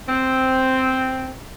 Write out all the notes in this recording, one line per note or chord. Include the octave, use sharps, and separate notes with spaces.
C4